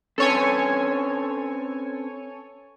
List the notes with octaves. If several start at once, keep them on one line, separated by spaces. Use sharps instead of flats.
C4 C#4 A4 B4 C#5 G#5